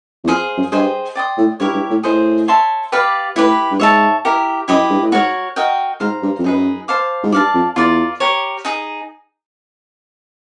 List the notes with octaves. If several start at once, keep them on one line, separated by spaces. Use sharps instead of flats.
E2
F2 G#4 C5 F5
F#2
G2 G#4 C5 D#5 G5
D5 G5 C6 D#6
A2
G2 E4 G4 A#4 C#5
G2
A2
A2 G#4 C5 D#5
C#5 E5 A5 C6
G4 B4 D5 F5
A2 E4 G4 B4
G2
G#2 C#5 E5 A5
E4 G4 A#4
F#2 E4 G4 B4 D#5
G2
A2
G#2 F#4 A#4 C#5
F#4 A#4 D#5 G5
G#2 C5 F5 A#5
G2
F2
F#2 D#4 G#4 B4
C5 F5 A5 D6
G#2
G2 D5 F5 A5
F2
E2 F4 A#4 D5
G4 A#4 C#5
D#4 G#4